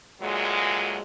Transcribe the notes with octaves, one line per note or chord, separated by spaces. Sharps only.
D2 A#2 F#3 G#3